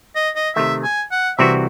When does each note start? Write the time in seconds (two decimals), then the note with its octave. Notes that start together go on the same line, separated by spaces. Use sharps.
0.15 D#5
0.36 D#5
0.55 C3 D#3 A3 E5
0.84 G#5
1.11 F#5
1.38 C2 C3 E3 C4 F#4 E5